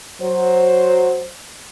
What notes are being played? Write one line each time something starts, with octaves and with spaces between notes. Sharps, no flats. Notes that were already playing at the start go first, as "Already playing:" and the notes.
F#3 C5